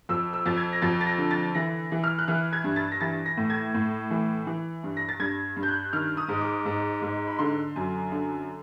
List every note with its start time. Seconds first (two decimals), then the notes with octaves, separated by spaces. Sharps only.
0.09 F2 E6
0.33 E6
0.46 F2 A6
0.57 G#6
0.73 A#6
0.82 F2 A6
1.01 A6
1.06 A#6
1.18 D3
1.31 A6
1.55 E3 A#6
1.92 E3
2.04 F6
2.19 F#6
2.28 E3 F6
2.53 G#6
2.64 G2
2.76 A6
2.92 A#6
3.01 E3 A6
3.26 A#6
3.37 A2
3.50 G#6
3.74 A2
4.11 E3
4.47 E3
4.83 G2
4.97 A#6
5.09 A6
5.20 G2 G#6
5.56 G2
5.63 G6
5.68 F#6
5.93 D#3 F6
6.17 D#6
6.29 G#2
6.41 D6
6.66 G#2
7.02 G#2
7.28 B5
7.39 D3 C6
7.76 F#2
8.12 D3